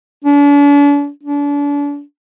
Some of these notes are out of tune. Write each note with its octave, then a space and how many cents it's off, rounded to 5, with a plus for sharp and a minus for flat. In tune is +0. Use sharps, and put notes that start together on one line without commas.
D4 -40
D4 -35